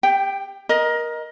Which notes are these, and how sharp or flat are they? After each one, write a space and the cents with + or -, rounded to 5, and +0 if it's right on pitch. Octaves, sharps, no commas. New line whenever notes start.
G4 +30 G5 +0
A#4 +20 D#5 +0